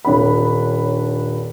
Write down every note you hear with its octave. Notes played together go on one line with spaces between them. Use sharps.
D#1 D4 C#5 B5